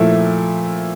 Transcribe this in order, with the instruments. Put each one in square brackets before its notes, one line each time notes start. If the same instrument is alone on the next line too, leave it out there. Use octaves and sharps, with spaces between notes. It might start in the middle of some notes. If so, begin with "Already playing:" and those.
Already playing: [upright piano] A#2 F3 A3 E4